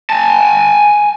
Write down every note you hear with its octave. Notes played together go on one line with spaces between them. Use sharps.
G#5 A5